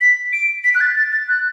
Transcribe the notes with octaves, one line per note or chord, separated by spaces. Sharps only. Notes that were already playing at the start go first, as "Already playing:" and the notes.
B6
D7
B6
F#6
A6
A6
A6
F#6